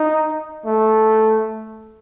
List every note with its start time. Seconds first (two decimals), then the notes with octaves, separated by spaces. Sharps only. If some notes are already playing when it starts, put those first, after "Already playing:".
Already playing: D#4
0.66 A3